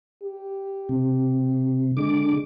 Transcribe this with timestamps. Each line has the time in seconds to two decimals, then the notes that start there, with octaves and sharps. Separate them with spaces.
0.23 G4
0.89 C3
1.97 D3 G#3 D6